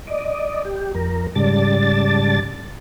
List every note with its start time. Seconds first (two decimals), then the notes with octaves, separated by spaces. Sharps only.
0.07 D5 D#5
0.65 G4
0.95 F2 A#4
1.35 G#2 C#3 G3 D5 A5 A6